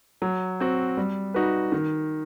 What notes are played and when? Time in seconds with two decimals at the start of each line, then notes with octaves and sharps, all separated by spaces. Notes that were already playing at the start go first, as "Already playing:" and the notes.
0.22 F#3
0.60 C4 F#4
0.97 G3
1.34 D#4 F#4 B4
1.72 D#3